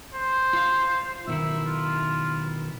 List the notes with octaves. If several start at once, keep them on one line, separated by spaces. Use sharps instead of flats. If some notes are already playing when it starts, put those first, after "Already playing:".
C5
F4 F5
B1 D#3 E4 E5
F4